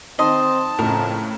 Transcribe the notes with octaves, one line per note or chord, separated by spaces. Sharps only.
D#3 C4 D#5 A5 C6
F2 A2 C#3 A#4